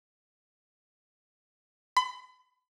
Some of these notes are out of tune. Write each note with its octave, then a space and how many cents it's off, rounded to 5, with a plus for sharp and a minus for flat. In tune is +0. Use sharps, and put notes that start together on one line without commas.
B5 +35